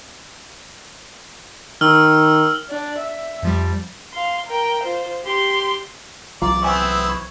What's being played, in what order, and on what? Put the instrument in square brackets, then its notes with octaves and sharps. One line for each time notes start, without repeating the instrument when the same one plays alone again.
[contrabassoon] D#3 [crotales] E6 F6
[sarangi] D4
E5
[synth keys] F2 F3 G3
[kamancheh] F5 C6
A#4 G5
F4 C5
G4 C6
[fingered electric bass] C2 E3 F#3 [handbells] F4 F5 A#5 [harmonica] D5
[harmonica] B3 C4 E4 [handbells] G5 G#5 C#6
[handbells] B5 C#6 G#6